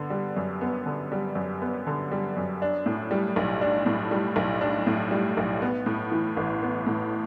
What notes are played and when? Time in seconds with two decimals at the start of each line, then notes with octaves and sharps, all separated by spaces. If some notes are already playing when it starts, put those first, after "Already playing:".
Already playing: D3 B3
0.10 G3
0.37 F#2
0.61 B3
0.86 D3
1.12 G3
1.35 F#2
1.62 B3
1.87 D3
2.11 G3
2.37 F#2
2.62 D4
2.86 A2
3.11 G3
3.36 B1
3.61 D4
3.86 A2
4.11 G3
4.36 B1
4.61 D4
4.87 A2
5.11 G3
5.37 B1
5.62 B3
5.86 A2
6.12 E3
6.37 A1
6.62 B3
6.86 A2